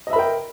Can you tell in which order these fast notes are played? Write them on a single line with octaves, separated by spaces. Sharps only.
D#5 E5 B5 A#4 G5